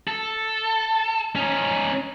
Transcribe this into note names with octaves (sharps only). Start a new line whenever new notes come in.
A4
C#4 D#4